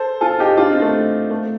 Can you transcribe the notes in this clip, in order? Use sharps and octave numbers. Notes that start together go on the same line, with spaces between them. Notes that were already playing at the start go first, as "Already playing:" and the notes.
Already playing: A4 C5
F4 A4
D#4 G4
D4 F4
C4 D#4
A3
A3